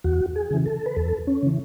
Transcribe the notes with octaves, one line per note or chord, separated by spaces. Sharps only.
E2 F#4
G#4
C#3 E3
A4
B4
E2 A4
C#4
C#3 E3